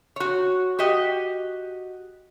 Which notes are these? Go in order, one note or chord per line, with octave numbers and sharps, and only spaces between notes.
F#4 C#5
F#4 G4 D#5